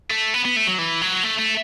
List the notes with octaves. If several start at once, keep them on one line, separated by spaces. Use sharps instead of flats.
A3
B3
B3
A3
F#3
E3
F#3
A3
A3